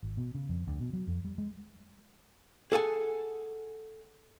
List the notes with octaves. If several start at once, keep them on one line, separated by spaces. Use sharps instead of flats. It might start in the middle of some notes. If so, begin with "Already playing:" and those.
G#1
B2
C#3
F2
D2
B2
F#3
F2
G3
G#3
G#4 A4 F#5 G#5